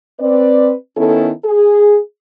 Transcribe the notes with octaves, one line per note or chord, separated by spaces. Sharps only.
C4 B4 D5
D#3 B3 C#4 E4 A4
G#4